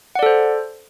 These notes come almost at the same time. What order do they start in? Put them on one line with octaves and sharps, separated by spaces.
F#5 D5 A4 C5